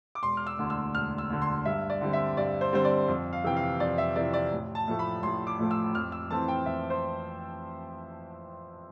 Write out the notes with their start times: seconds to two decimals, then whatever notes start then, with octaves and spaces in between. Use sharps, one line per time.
0.15 D6
0.22 E1 C6
0.37 F6
0.47 E6
0.59 D2 D3
0.70 E6
0.94 E1 F6
1.18 E6
1.30 D2 D3
1.42 C6
1.65 G2 E5
1.90 D5
2.01 D3 G3 C4
2.13 E5
2.37 G2 D5
2.61 C5
2.73 D3 G3 C4 C5
2.85 D5
3.08 F2
3.33 F5
3.44 C3 E3 G5
3.56 F5
3.80 F2 D5
3.98 E5
4.16 C3 E3 D5
4.34 D5
4.52 A1
4.75 A5
4.87 A2 F3 A3
4.99 B5
5.23 A1 C6
5.47 D6
5.59 A2 F3 A3
5.71 E6
5.95 F2 F6
6.12 E6
6.30 E3 A3 C4 A5
6.48 G5
6.66 F2 E5
6.90 C5